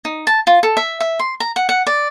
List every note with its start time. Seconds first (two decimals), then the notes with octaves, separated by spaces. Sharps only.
0.05 D#4
0.27 A5
0.47 F4
0.63 A4
0.77 E5
1.00 E5
1.19 C6
1.40 A#5
1.56 F#5
1.69 F#5
1.87 D5